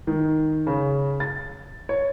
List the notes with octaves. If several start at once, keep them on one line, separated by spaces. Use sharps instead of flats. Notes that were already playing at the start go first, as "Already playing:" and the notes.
D#3
C#3
A6
C#5